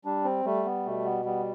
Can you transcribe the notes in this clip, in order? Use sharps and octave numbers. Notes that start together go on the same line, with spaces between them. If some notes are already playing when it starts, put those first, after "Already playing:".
G3 D4
C4
G3 A3
B3
B2 A3
B3
G3 B3